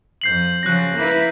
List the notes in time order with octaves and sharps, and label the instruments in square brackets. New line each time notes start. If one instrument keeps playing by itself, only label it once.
[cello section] F2 [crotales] G6 C7 F#7
[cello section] C#3 F3 F#3 [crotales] F#6 A#6
[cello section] A#3 E4 B4